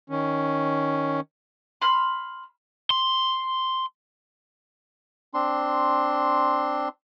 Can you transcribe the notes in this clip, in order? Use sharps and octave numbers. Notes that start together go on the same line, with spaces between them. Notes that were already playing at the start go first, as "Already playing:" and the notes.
D#3 C#4
B5 C6 F6
C6
C4 D4 C6